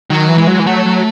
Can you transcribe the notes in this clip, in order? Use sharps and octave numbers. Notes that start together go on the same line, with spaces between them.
D#3 F#3
E3
G#3
F#3
E3
F#3 A3
F#3